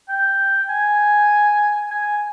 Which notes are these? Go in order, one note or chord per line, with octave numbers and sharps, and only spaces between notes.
G5
G#5
G#5